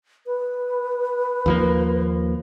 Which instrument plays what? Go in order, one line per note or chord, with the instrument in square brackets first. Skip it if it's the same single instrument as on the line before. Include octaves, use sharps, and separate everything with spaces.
[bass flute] B4
[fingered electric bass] D#2 F3 A#3